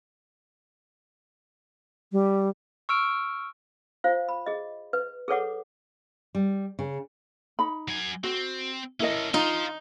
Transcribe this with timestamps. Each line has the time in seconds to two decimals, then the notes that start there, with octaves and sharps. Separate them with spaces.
2.12 G3
2.89 C#6 E6 F6 D7
4.04 F4 C5 F5
4.29 B5
4.46 G#4 D#5
4.93 B4
5.28 G#4 A4 B4 C#5 F#5 D6
6.35 G3
6.79 C#3
7.59 D#4 B5
7.88 F#3 G#5
8.24 C4 F#4
9.00 C#4 E4 A4 A#4 D#5
9.34 D#4 F4 C5 F5